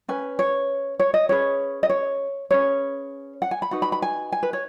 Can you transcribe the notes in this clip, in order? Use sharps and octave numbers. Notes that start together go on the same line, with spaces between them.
C#4 B4 G#5
C#5
C#5
D#5
C#4 G#4 B4 C#5
D#5
C#5
C#4 G#4 B4 C#5
F#5
G#5
B5
D#4 F#4 B4 F#5
B5
B5
G#5
G#5
B4
C#5